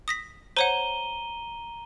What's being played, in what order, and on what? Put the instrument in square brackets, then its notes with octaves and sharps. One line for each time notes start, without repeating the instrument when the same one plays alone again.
[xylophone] D#6 A#6 B6
[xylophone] C5 C#5 F#5 [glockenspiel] A#5 D#7 G7